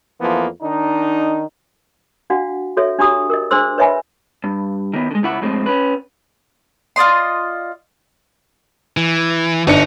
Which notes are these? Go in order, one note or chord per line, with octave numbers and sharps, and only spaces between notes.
F2 E3 F3 A#3 B3
D#3 D4 D#4
D4 F#4 F5 F#5
F#4 A4 C#5 E5
D4 F#4 G4 A#5 D#6
A#4 D#5
D4 G#4 C5 C6 E6
B4 C#5 D#5 E5 G#5 B5
G2
D#3 B3
D3 G#3
C#2 E4 F#5
F2 A2 G#3 A3 C4
C#4 B4
F4 D5 D#5 C6
E3
G1 D4 D#4 C#7